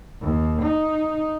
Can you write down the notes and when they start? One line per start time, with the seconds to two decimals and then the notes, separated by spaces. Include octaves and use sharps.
0.21 D#2
0.62 D#4